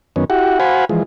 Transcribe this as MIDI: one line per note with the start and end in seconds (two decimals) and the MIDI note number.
0.16 0.25 42
0.16 0.25 51
0.16 0.25 59
0.16 0.25 61
0.30 0.59 64
0.30 0.59 66
0.30 0.59 67
0.30 0.59 78
0.60 0.85 66
0.60 0.85 72
0.60 0.85 77
0.60 0.85 78
0.60 0.85 80
0.60 0.85 83
0.89 1.03 52
0.89 1.03 53
0.89 1.03 56